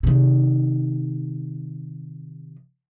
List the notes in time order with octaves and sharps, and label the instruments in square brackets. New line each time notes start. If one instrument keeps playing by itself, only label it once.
[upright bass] C3 D#3